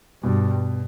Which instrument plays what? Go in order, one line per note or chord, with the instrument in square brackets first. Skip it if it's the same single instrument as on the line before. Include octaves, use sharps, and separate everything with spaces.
[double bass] G2 [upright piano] B2